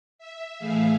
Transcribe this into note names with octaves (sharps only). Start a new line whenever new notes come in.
E5
A2 E3 A3 G#4 E5 F5